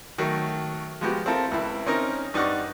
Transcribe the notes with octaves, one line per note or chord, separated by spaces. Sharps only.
D#3 F#3 A3
F3 G#3 B3 F#4 G4
C4 E4 F4 A4 A#4
C#2 E4
C4 C#4 D#4 A#4
G2 D#4 D5 F#5 C#6